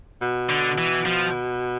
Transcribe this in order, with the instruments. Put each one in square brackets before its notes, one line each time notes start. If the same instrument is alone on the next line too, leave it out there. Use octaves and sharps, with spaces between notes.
[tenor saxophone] B2
[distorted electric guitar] D3
E3
F3